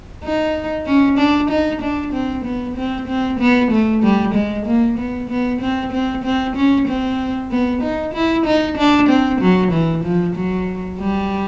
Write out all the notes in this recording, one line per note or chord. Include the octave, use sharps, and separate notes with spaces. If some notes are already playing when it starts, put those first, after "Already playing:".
D#4
C#4
D4
D#4
D4
C4
B3
C4
C4
B3
A3
G3
G#3
A#3
B3
B3
C4
C4
C4
C#4
C4
B3
D#4
E4
D#4
D4
C4
F#3
E3
F3
F#3
G3